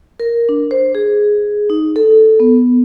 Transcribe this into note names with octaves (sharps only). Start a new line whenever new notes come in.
A#4
D4
C5
G#4
D#4
A4
B3